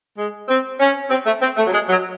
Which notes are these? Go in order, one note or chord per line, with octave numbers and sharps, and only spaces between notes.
G#3
C4
C#4
C4
A3
C4
A3
F#3
G#3
F#3